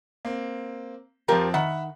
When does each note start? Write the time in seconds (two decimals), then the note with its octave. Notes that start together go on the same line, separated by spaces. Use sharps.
0.25 A#3 C4
1.28 F2 F3 C4 F4 G4 A#4
1.54 D#3 E5 F#5 B5